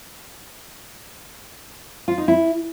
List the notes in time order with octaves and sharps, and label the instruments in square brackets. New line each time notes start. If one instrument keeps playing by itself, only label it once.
[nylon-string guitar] F4
D#4
E4